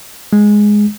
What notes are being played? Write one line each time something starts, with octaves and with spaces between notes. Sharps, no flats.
G#3